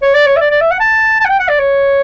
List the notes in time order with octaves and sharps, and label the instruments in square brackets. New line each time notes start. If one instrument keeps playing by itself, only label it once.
[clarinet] C#5
D5
C#5
E5
D5
D5
E5
F#5
A5
A5
F#5
G5
F#5
D5
C#5